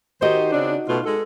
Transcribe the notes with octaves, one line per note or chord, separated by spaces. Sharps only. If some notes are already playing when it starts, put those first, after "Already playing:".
D#3 D#4 F#4 G4 C5 D#5
C#3 C4 D4
B2 A3 F4
G#3 A4